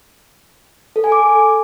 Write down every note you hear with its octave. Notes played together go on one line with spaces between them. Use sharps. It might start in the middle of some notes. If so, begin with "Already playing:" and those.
A4
G#5
D6